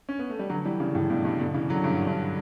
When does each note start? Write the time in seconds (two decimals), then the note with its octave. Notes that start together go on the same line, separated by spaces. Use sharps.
0.09 C#4
0.19 B3
0.30 A3
0.39 G3
0.50 D3 F#3
0.65 E3 G3
0.80 C#3 E3
0.95 A2 C#3
1.10 G2 B2
1.25 G2
1.39 B2 D3
1.54 C#3 E3
1.69 D3 F#3
1.84 G2
2.07 G2